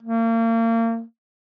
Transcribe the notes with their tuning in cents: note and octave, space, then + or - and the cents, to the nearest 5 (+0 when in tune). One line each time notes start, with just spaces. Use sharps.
A#3 -35